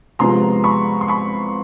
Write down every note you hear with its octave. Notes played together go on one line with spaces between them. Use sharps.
C2 C3 F3 G#3 B3 A#5 C6
B5 C#6
C6
B5 C#6